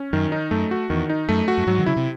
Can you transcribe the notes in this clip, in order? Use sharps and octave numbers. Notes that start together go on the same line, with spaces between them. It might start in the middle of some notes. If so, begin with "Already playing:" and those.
Already playing: C#4
F#2 D#3
D#4
F#2 A3
F#4
E2 D#3
D#4
F#2 A3
F#4
F#2
G#2 F#3
D#3
C#3 E4
C3